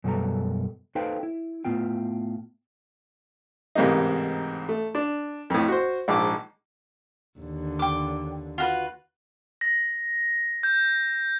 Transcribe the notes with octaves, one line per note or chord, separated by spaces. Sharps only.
F#2 B2 G3 B3 A4 A#5
D#4 A4 B4 C5 F5 G5
E4
A2 B3 F4 G5
A1 G#2 C3 A#3 D#4
A3
D4
F2 A2
F#4 C5
A#1 G#2 A5 D6
D#2 D3
G5 D6
F4 F#4 B4
A#6
G6